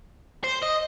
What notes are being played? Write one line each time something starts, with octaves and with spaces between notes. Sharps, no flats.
C5
D#5